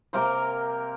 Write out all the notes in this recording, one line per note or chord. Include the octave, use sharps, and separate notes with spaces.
C3 A#3 A#4 C5